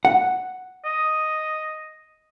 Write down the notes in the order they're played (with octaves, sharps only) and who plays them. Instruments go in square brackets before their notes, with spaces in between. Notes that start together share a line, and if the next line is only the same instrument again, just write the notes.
[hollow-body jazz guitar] F#5
[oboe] D#5